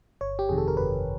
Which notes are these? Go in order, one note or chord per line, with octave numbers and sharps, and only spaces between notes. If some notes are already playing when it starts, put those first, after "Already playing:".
G1 C#5
G4
F2 C3 D#3 G#4
A4
A#4
G1 B4